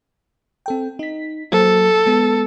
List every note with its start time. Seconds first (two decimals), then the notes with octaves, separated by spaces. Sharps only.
0.66 C4 A4 G5
0.99 D#4 B6
1.52 F#3 A#3 A4 C5
2.06 G#3 B3